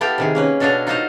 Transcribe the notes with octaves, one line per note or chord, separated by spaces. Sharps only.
B3 E4 G4 A4 F5 G5
C3 D#3 G#4
A#3 C#4 B4
B2 D4 A4 C#5 D#5 F5
D#4 F4 F#4 C5 D#5 F5